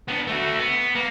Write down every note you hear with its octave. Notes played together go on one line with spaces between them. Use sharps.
B3 D4
A3 F#4
B3
A#3